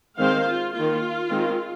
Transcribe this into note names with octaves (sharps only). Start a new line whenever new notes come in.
D#3 G#3 C4 C5 F5
F4
D#3 A#3 F4
D#3 G#3 C4